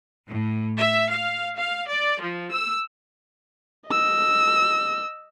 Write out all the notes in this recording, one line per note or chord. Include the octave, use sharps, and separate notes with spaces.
A2
E5
F5
F5
D5
F3
E6
D#5 E6